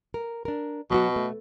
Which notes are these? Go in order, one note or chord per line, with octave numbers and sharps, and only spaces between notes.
A#4
D4 A#4
B2 F#3 B3 F#4
A3